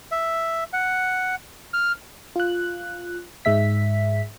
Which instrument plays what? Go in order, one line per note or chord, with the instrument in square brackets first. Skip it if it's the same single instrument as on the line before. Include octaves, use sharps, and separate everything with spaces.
[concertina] E5
F#5
F6
[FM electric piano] F4 F#6
G#2 G#3 E5 B6